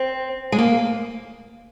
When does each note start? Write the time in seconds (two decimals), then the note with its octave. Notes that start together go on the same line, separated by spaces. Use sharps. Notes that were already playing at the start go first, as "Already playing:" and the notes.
Already playing: C4
0.52 G#3
0.58 A#3